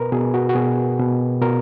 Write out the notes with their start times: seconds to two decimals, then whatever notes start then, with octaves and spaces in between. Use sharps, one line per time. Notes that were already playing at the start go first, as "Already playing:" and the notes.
Already playing: B2 A#4 B4
0.12 B2 G#4
0.34 F#4
0.49 F#4
0.55 B2 G#4
0.99 B2
1.42 B2 A#4